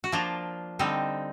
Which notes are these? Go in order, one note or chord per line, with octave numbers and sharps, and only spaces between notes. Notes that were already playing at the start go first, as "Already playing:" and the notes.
F#4
F3 A#3 D4 F4
D3 G3 C4 D#4